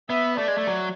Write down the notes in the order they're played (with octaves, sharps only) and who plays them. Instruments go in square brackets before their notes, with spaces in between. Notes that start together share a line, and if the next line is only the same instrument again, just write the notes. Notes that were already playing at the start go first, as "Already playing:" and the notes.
[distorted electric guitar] B3 [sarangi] E5
[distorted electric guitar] A3 [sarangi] D5
[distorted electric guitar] G#3
A3
F#3